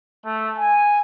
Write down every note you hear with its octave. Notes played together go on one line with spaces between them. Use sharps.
A3
G#5